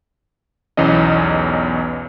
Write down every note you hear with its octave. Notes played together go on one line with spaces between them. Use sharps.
B1 E2 E3 C#4 D#5